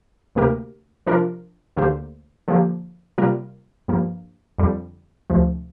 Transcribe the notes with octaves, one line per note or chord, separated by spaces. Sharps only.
D2 C3 A#3 G4 A#4
C3 F3 D4 F4 A#4
D2 D3 A#3 G4 C5
D3 F3 A#3 G4
C3 G3 A#3 F4 A#4
G2 F3 A#3
F2 D3 G3
D2 C3 F3